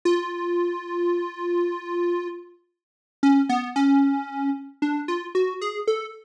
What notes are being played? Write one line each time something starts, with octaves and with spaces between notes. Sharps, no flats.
F4
C#4
B3
C#4
D4
F4
F#4
G#4
A4